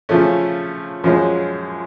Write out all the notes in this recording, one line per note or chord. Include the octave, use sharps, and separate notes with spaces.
C#3 F3 A3 C#4
F#2 F3 G#3 C#4